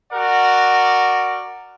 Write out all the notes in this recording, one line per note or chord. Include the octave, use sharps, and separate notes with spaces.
F#4 A#4 D5 F#5